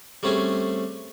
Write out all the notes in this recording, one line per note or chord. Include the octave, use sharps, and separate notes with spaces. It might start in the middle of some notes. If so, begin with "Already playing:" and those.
G3 A3 C4 C#4 G#4